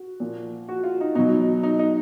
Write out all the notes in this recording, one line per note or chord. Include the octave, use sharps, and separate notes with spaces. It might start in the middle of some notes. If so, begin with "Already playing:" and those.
Already playing: F#4
A#2 F3
F#4
F4
D#4
B2 F#3 D#4
D#4
D#4